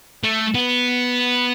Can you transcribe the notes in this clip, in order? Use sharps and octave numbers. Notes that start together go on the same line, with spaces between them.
A3
B3